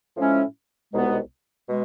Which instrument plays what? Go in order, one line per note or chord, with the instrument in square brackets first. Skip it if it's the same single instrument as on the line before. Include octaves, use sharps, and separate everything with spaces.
[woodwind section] A2 F3 G#3 C#4 E4
C2 B2 G#3 B3 D#4
B2 G#3